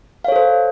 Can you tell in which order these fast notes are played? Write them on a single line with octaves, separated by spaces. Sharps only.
F5 C#5 A4 C5